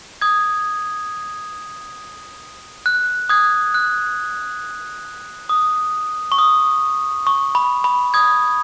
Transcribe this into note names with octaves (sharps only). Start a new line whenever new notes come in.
D#6 G#6
F#6
D#6 G#6
F#6
D#6
C#6
D#6
C#6
B5
B5
D#6 G#6